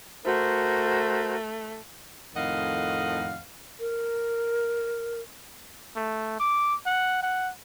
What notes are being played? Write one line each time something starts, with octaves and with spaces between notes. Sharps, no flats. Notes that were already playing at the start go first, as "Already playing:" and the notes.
A3 F#4 A#4 C5
F2 A2 D#3 D#5 F5 F#5
A#4
A3
D6
F#5
F#5